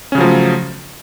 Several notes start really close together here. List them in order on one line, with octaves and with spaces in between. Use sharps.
C#4 C#3 F#3 F3 A3